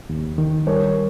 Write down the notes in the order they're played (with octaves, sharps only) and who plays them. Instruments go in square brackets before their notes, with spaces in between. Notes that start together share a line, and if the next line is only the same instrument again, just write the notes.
[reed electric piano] D#2
D#3
[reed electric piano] G3 [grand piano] A#4 C#5